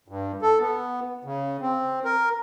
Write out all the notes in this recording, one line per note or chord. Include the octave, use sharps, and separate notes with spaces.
G2
A4
B3
C#3
C4
A#4